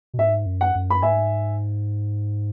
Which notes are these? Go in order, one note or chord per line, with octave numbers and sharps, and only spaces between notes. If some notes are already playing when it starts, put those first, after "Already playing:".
B2
G#2 E5
F#2
F#5
F#2
B5
G#2 E5 G#5